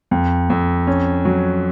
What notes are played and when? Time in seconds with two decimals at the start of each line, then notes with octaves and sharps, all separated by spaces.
0.11 F2
0.50 F2
0.87 C#4
1.25 F#3